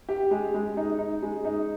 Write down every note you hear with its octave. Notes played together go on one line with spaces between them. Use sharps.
G4
G#3
G#3
D#4
D#4
G#3
D#4